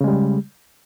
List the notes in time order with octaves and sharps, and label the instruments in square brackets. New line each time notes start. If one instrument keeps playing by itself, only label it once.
[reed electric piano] C#3
G#3
G3